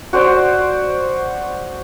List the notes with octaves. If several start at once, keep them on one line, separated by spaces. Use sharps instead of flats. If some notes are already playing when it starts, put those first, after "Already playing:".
F#4 C5 D5